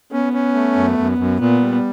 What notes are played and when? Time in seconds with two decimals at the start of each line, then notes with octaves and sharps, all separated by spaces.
0.11 B3 C#4
0.33 C#4
0.54 A3
0.76 F#2
0.98 F#2
1.18 F#2
1.40 A#2 B3
1.62 G3